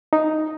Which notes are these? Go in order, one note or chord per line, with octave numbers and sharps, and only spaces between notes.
D#4